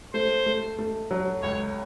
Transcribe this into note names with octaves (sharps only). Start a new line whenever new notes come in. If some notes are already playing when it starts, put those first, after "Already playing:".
A3 C5
A3
A3
F#3
C#2 C#5